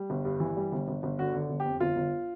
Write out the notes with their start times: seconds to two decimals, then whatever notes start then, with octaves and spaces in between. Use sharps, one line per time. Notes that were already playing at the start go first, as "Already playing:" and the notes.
Already playing: G3
0.10 G1
0.25 G2
0.40 E3
0.57 G3
0.72 G1
0.88 G1
1.03 G1
1.19 D3 F#4
1.34 D3
1.50 G1
1.60 G4
1.66 F2
1.80 G1 F4
1.96 G1